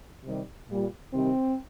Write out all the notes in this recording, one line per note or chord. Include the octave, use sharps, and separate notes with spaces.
C3 D#3 G3
A#2 G3
C3 D#3 G3 C4